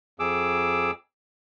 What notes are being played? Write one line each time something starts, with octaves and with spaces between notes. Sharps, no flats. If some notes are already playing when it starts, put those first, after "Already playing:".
F2 G#4 D6 E6